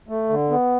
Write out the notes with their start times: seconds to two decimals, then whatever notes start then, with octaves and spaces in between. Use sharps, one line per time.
0.09 A3
0.29 D3
0.50 B3